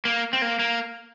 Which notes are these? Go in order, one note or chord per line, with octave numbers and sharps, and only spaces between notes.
A#3
C4
A#3
A#3